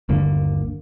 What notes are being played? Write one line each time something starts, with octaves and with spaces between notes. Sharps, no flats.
G1 D#2 D3 A#3